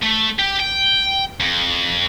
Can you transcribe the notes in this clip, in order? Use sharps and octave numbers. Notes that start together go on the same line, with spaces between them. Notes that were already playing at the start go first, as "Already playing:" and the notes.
A3
G4
G5
F2